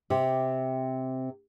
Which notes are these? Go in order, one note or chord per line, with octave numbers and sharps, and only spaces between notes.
C3 C4 G4